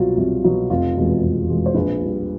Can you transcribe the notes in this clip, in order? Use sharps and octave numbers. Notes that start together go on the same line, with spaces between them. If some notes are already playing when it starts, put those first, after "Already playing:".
Already playing: C2 B2 F#3 F4
C2
B2 F#3
F1 F4
E2 B2 G#3
F1
E2 B2 G#3
C5
A#1 B4
A#2 G3